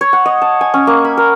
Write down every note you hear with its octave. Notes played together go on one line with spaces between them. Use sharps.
C#5
F#5
D#5
A5
G#5
C#4
A#3
B5
A#4